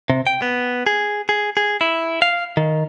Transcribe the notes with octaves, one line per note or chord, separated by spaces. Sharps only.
C3
G5
B3
G#4
G#4
G#4
E4
F5
D#3